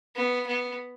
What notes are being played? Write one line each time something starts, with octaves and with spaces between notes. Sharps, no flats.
B3
B3